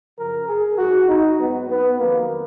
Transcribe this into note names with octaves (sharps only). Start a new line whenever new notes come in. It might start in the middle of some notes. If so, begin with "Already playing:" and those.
F#2 C#3 F3 A#4
G#4
G#2 F#3 F#4
D#4
G#2 F#3 B3
B3
F2 D#3 F#3 A#3